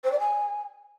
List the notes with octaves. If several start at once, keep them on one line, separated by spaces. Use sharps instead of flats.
C5
D5
G#5